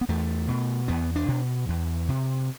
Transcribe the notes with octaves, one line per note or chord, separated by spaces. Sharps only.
B3
E2 A3
B2
E2 B3
D4
B2
E2
C3